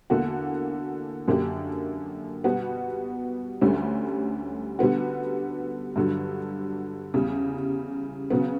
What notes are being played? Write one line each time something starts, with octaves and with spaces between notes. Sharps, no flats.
E2 D3 A#3 D4 F#4
F#2 D3 A#3 D4 G4
B2 G3 B3 F#4
D2 D3 G3 C#4
D3 G3 B3 F#4
G2 D3 F#3
E2 C#3 G3
C#3 F#3 B3